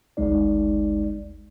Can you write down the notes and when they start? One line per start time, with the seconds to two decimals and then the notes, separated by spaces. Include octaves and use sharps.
0.17 G#1 D2 G#3 D#4 D5